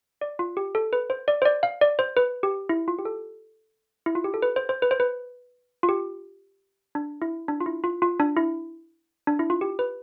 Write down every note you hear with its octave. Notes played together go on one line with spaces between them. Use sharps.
D5
F4
G4
A4
B4
C5
D5
C5
D5
F5
D5
C5
B4
G4
E4
F4
G4
A4
E4
F4
G4
A4
B4
C5
C5
B4
C5
B4
F4
G4
D4
E4
D4
F4
E4
F4
F4
D4
E4
D4
E4
F4
G4
B4